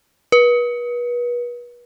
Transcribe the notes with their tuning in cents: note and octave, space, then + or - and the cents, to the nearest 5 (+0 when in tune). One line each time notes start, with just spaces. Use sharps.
B4 -35